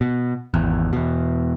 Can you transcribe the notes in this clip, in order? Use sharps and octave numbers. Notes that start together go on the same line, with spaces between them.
B2
G#1 E2
E2 B2